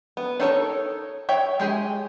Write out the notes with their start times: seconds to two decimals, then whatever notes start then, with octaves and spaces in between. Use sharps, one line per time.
0.17 B3
0.40 D4 D#4 A4 A#4 C#5
1.29 C#5 E5 G5
1.60 G#3 G4 G#4